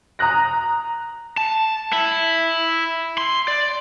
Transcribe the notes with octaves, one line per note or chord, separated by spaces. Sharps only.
A#5 D#6 F#6 A#6
A5
E4
C6
D5